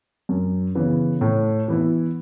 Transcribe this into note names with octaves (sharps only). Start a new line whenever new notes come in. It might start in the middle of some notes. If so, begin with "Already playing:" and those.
F#2
C#3 E3 B3
A2
E3 B3 E4